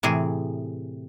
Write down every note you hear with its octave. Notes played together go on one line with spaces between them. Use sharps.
A2 C3 E3 G#4